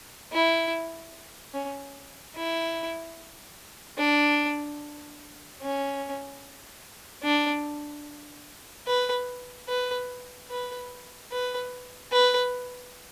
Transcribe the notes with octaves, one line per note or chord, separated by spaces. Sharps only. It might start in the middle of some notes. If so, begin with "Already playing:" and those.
E4
C#4
E4
D4
C#4
D4
B4
B4
B4
B4
B4